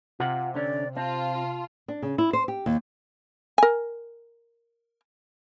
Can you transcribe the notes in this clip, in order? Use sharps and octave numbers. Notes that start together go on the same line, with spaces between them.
C3 F4 F#5
D3 C#4 D5
C4 F4 A5
D4
C#3
E4
C5
G4
D#2
A#4 G#5